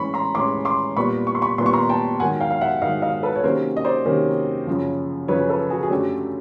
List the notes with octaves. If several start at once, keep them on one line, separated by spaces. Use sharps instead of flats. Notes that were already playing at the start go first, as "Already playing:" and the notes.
Already playing: A2 E3 G#3 C#4 B5 C#6
A#5 C6
A2 E3 G#3 C#4 C6 D6
C6 D6
A#2 G3 B3 B5 C#6
C#6
C6
B5 C#6
A#2 G3 B3 C6
C#6
A#5 C6
G5 A5
G#2 D#3 F#3 F#5 G#5
F5 G5
F5
E5 F#5
G#2 D#3 F#3 D#5 F5
D#5 F5
A4 B4
C#5
C3 D#3 F#3 A#3 C#4 A#4 C5
D#5
C5 D5
C3 D#3 F#3 A#3 C#4
F#2 C#3 F3
F#2 C#3 F3 B4 C#5
A4 B4
F#4 G#4
G#4
F#2 D3 F#3 A3 C#4 G4